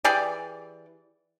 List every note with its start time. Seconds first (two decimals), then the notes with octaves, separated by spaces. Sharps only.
0.04 E3 G4 G#4 D5